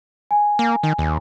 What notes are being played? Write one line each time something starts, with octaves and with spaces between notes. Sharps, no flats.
G#5
A#3
D#3
D#2